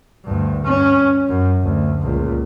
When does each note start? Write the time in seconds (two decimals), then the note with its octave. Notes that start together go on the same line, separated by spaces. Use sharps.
0.24 D2 G2
0.64 G2 C#4
1.29 F#2
1.63 D2
2.01 C#2 A#2